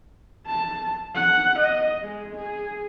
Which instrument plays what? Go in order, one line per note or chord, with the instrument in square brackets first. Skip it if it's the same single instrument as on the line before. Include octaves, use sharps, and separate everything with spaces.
[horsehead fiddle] A5
F#5
D#5
G#3
G#4